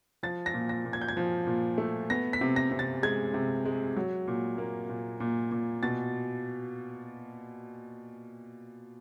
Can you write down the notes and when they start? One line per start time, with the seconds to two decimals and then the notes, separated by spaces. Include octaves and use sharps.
0.23 F3 A6
0.46 A#6
0.54 A#2
0.69 A#6
0.85 A#2
0.93 G#6
1.01 G6
1.08 G#6
1.17 F3
1.47 A#2
1.78 A3
2.10 B3 A#6
2.33 B6
2.41 C3
2.56 A#6
2.71 C3
2.79 A6
3.03 G#3 G#6
3.34 C3
3.65 G#3
3.96 F#3
4.28 A#2
4.58 A#3
4.89 A#2
5.20 A#2
5.51 A#2
5.83 B2 A6